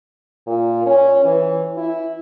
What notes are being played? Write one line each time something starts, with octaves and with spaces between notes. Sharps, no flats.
A#2
C#4
E3
E4